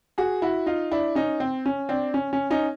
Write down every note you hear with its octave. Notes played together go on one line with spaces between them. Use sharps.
F#4 G#4
E4 F#4
D#4 F4
D4 E4
C#4 D#4
C4
C#4
C4 D4
C#4
C#4
C#4 D#4